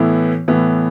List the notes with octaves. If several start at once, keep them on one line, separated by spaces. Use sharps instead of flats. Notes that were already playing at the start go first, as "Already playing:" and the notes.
Already playing: A2 E3 B3 E4
A2 E3 B3